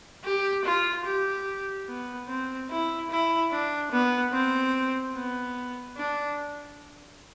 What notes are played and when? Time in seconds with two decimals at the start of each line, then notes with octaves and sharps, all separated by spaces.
0.25 G4
0.65 F4
1.06 G4
1.88 B3
2.29 C4
2.70 E4
3.10 E4
3.52 D4
3.92 B3
4.33 C4
5.15 B3
5.97 D4